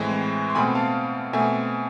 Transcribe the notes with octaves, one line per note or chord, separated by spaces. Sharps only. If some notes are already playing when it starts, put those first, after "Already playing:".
Already playing: A2 E3 G#3 C4
C6
B2 A3 C4 G#5 B5
F5 A5
B2 A3 C4 E5 G#5